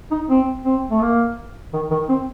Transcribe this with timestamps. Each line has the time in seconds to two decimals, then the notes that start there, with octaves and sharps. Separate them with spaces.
0.11 D#4
0.29 C4
0.65 C4
0.90 A3
1.02 A#3
1.73 D#3
1.90 D#3
2.09 C4